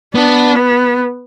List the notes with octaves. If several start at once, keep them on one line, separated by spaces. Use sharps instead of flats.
B3 D4
B3